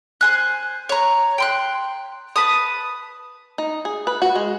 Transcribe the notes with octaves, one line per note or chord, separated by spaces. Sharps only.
C5 G#5 F#6
C#5 A#5
G5 C6 F#6
B4 A5 D#6
D#4
G#4
B4
F#4
G#3